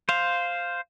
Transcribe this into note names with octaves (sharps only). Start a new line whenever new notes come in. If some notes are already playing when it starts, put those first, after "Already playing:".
C5 F5